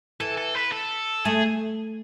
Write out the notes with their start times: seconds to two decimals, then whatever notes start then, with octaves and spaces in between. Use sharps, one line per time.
0.20 E3 A4
0.38 A4
0.55 B4
0.72 A4
1.25 A3 G#4